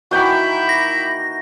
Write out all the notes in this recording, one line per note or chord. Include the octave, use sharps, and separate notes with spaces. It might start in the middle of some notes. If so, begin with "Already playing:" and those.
D#3 E3 A#3 E4 F#4 G5 B5
A#6